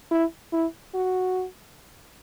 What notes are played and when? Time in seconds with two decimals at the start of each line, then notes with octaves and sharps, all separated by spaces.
0.11 E4
0.53 E4
0.95 F#4